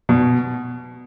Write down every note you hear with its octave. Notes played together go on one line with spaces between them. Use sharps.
B2